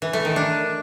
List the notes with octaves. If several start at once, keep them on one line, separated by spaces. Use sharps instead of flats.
E3
A3
D#3
D4